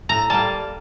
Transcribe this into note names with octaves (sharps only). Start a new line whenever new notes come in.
A2 A#5
G3 A#3 A5